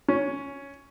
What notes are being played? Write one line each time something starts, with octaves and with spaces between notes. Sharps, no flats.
C#4